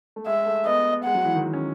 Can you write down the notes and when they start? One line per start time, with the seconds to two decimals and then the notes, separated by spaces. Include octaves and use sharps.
0.16 A3
0.26 G#3 E5
0.46 A3
0.66 B3 D#5
1.05 G#3 F#5
1.15 F#3
1.25 E3
1.35 D#3
1.44 E3
1.53 C#4